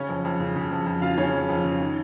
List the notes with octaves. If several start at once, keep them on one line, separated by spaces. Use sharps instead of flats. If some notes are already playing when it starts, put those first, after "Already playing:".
Already playing: C#3 C#4 C#5
F2
F2
C#3
C#3
F2
F2
C#3 F4 F5
C#3 C#4 C#5
F2
F2
C#3
D#3